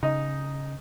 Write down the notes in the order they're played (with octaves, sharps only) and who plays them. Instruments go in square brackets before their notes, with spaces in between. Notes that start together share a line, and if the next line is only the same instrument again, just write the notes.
[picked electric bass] C#3 [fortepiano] D#4